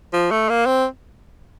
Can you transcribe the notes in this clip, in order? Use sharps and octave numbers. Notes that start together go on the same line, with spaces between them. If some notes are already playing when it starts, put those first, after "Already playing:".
F3
A3
A#3
C4